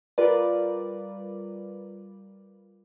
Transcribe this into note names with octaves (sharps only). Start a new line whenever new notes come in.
G3 F4 A#4 B4 D5